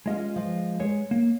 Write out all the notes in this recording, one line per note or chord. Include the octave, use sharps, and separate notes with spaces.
G#3 C#4 F4 D#5 F5
F3
G#3 C#5
A#3